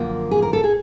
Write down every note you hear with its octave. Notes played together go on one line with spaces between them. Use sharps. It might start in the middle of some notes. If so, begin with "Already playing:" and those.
Already playing: F#2 D3 F3 A#3
G#4
A#4
A4
G#4